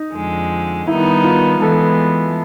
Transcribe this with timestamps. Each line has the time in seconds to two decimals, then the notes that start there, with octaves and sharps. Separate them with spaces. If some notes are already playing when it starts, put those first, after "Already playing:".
Already playing: D#4
0.14 F2 D3 F3 G#3
0.87 D#3 G3 B3 D#4 E4
1.24 F4
1.61 E3 G#3 B3 A4